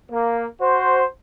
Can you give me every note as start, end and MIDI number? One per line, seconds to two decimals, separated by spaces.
0.11 0.45 58
0.61 1.04 66
0.61 1.04 72